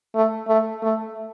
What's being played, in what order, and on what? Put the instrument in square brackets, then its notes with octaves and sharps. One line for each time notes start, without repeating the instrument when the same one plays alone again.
[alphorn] A3
A3
A3